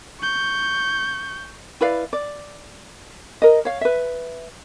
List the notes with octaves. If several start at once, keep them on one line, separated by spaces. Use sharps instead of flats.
C#6 G6
E4 B4 D5 F5
D5
A#4 D#5
C#5 F5
B4 E5